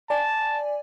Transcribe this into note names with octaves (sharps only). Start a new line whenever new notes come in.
D5 G#5 A5